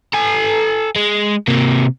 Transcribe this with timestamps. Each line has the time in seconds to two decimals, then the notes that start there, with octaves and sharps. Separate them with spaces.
0.13 A4 G#5
0.96 G#3
1.48 C3 A#3